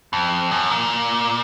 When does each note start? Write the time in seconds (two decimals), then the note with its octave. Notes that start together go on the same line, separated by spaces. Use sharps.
0.13 F2
0.51 F#2
0.70 A#2